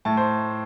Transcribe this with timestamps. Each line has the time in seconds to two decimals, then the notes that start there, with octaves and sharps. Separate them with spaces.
0.05 A2 A5
0.17 C5